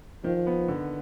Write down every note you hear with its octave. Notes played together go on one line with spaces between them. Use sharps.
D#3 F3
B3
D3